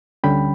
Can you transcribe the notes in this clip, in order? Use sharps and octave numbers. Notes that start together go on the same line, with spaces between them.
D2 D3 G3 C#4 G5 B5